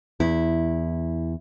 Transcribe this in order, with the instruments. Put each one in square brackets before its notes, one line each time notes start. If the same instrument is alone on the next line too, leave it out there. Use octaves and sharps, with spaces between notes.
[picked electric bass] E2 [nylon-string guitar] E4